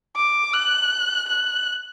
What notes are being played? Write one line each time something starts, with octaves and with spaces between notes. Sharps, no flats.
D6
F#6
F#6